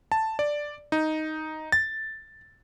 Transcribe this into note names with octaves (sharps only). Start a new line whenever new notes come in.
A5
D5
D#4
A6